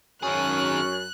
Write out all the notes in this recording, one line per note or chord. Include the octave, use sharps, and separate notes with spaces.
F#2 D#3 C#4 G#4 F#6